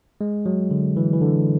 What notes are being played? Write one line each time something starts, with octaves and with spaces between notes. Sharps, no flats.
G#3
F#3
D3
E3
E3
D3